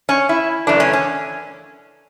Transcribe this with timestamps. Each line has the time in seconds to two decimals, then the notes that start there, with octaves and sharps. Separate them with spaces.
0.09 C#4
0.29 E4
0.67 F#2 C#3 E3 A3 D4
0.80 C#4
0.93 C#4